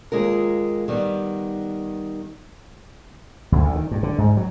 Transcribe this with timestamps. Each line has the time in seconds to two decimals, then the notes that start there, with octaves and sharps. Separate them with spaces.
0.12 D#2 G#3 F4 A#4
0.88 D#3 G3 B3
3.52 D2
3.64 D2
3.76 D#3
3.91 G2
4.03 D3
4.18 G#2
4.37 F#3